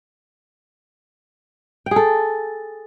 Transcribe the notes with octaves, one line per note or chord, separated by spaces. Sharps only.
G#4 A4 G5